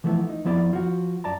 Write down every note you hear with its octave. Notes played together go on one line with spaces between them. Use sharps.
E3 F3 A3 B3 E4
D#4
F2 F3 B3 E4 D5
F3 F#4
F#2 D5 A5 A#5